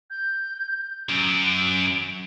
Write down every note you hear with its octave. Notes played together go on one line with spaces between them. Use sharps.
G6
F#2 D7